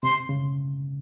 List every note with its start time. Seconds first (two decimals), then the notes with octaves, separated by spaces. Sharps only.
0.03 C3 C6
0.29 C#3